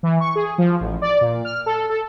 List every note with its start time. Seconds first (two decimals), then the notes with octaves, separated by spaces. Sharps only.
0.03 E3
0.20 C#6
0.35 G#4
0.58 F3
0.81 A1
1.02 D5
1.21 A#2
1.45 F6
1.66 A4
1.89 A4